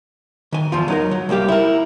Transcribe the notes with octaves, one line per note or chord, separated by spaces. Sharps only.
D#3 G#5
E2 F3 F4
F#3 D#4 A#4
F#3
C2 G3 A#3 G4 F5
E4 A#4